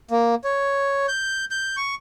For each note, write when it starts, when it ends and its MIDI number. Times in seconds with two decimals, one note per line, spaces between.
0.11 0.35 58
0.44 1.06 73
1.08 1.45 91
1.51 1.76 91
1.77 1.95 85